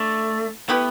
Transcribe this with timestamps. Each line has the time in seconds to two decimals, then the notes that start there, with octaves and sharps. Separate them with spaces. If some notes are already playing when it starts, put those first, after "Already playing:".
Already playing: A3 D4
0.69 A3 B3 E4 G4 B4